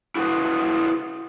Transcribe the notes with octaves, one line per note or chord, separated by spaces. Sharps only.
E4 F#4 G#4 B4 C5